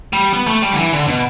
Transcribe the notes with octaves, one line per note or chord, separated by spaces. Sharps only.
G3
B3
A3
G3
D3
E3
D3
B2